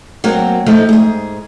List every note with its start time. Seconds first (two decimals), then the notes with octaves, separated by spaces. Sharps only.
0.24 F#3 A#3 C4 F#4
0.66 F3 A3 D#4
0.89 G#2 G#4